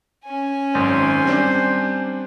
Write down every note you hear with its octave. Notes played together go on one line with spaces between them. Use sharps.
C#4 G#5
G#1 F#2 C5
G3 C4 D4